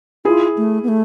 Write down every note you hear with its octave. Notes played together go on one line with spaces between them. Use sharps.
E4 F4 G#4
A3
B3
A3